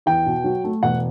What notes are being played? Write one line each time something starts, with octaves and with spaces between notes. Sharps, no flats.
E2 G5
B2
F#3
A3
E1 F#5